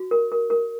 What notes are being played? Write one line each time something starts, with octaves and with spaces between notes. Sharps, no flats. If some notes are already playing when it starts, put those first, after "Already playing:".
Already playing: F#4
A#4
A#4
A#4